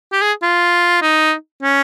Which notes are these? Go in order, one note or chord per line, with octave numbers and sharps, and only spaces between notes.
G4
G#4
F4
D#4
C#4